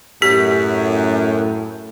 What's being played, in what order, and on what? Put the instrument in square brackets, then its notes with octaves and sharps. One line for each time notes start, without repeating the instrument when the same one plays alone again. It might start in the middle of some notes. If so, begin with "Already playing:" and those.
[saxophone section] F#2 [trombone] A2 [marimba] G4 [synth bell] B6